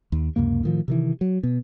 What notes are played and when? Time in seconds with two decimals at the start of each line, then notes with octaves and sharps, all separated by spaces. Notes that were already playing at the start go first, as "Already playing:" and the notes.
0.12 D#2
0.36 C#2 F#2 C3 A#3
0.63 A2 D#3 F3
0.88 C3 D#3 E3
1.21 F#3
1.43 B2